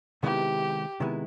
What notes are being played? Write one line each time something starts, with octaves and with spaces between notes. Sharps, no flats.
C3 D#3 G#3 B3 E4 G4
C3 D#3 G#3 B3 E4